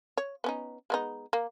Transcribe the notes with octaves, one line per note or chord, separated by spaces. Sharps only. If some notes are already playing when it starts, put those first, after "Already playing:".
C#5
B3 C#4 D#4
G#3 B3 D#4
A#3